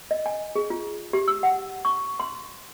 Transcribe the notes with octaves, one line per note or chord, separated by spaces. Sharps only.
D#5
G#5
G#4
F4
G4
E6
F#5
C#6
C6